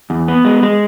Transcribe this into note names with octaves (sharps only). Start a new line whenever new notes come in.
E2
B3
G#3
G#3